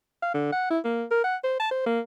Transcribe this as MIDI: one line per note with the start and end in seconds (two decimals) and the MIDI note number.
0.22 0.33 77
0.34 0.51 50
0.53 0.66 78
0.71 0.79 64
0.85 1.04 58
1.11 1.23 70
1.24 1.36 78
1.44 1.60 72
1.60 1.70 81
1.71 1.83 72
1.86 2.00 58